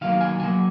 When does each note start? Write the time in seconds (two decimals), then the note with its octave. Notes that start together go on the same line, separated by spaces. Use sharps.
0.01 D#3 F#3 A#3 F5
0.21 G#5
0.40 D#3 F#3 A#3 G#5